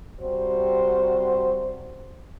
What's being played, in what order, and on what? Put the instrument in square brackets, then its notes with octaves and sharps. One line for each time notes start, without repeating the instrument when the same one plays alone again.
[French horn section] C3 G3 F#4 C5